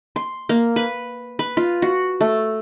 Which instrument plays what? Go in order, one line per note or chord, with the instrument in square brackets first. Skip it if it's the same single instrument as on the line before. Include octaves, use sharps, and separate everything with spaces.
[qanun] C6
A#3
B4
B4
F4
F#4
A3